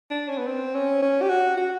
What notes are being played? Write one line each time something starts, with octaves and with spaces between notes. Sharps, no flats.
D4
C#4
B3
C4
C#4
C#4
G4
F#4
F#4